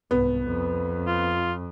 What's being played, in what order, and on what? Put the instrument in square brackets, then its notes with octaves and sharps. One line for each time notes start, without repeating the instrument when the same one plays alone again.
[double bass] C2 G#2 [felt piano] B3
[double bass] F2
[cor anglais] F4